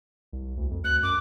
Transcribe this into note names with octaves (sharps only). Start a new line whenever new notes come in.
C2
D2
F2
D2 F#6
F#2 D6